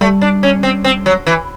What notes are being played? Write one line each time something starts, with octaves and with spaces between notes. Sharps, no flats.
G3 A3
D4
C#4
C4
C4
F#3
E3